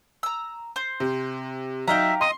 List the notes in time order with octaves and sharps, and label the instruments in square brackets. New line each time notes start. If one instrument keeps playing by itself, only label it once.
[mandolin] A#5 E6
C5
[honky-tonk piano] C3
[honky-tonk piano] F#3 D#4 [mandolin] G4 F5 A#5 [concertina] E5
[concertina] D#5 D#6 [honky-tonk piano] C6